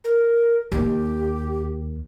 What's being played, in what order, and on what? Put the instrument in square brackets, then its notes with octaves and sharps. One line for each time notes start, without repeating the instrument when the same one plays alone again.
[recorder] A#4
[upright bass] D#2 [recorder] G4